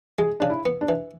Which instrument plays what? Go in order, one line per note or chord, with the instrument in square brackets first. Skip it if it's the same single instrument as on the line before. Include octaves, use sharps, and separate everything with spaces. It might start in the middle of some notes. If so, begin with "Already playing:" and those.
[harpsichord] G#3 [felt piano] G#4
[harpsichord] C#3 [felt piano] D4
[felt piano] E4
[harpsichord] B3
[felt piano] D4
[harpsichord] E3